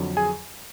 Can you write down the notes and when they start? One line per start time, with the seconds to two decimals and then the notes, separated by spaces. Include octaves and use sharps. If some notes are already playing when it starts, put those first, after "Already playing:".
Already playing: F2 D3 F#3
0.17 G#4 G#5